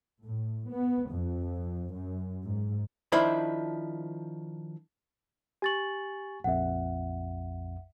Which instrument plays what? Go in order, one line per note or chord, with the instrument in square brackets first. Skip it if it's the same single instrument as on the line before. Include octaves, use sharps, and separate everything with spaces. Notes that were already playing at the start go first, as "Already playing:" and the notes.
[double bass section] A2
B3
F2
F#2
G#2
[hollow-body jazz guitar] D#3 F3 D4 E4 C5 B5
[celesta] G4 A6 F#7 [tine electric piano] G#5 C#6
[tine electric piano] A#1 F2 [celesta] E5 F#5